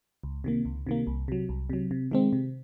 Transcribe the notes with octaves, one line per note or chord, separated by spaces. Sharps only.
C#2
C3 D#3 A#3
C#2
C3 D#3 A#3
C2
C3 F#3
C2
C3 F#3
C3
D#3 G#3 C4
C3